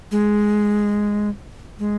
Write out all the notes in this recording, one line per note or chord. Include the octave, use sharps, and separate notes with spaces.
G#3
G#3